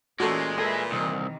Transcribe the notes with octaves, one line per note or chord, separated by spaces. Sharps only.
A#2 E3 G#3 A3 C#4 F#4 A4
A4 B4 E5 G#5 D#6
C2 C3 D#3 E3